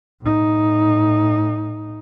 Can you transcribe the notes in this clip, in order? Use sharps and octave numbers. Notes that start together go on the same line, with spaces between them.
A2 D#4